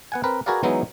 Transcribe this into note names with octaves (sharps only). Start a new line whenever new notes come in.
B3 F#5 G#5
C4 A#4 B4
F#4 G#4 A#4 B4 D5 F5
E3 F#3 G#3 B3 D#4 E4